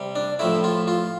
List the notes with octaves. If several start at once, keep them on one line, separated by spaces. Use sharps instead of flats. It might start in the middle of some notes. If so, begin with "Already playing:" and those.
Already playing: C3 G3
D4
A2 F3 A3 E4
F4
F4